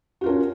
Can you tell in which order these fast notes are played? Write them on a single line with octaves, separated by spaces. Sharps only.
F#4 F4 A#4 C#4